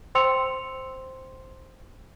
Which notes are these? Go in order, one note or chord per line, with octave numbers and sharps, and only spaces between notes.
C5 G5 C6 E6 C#7 F7